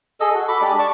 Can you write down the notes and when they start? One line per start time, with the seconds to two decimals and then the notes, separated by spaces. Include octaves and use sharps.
0.20 G#4 A4 D#5 E6
0.35 F#4
0.48 A4 B5 D6
0.61 G#3 D4 G4 D5
0.79 D5 A5 C#6 D6